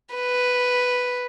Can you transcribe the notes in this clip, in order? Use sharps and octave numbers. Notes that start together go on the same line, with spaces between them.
B4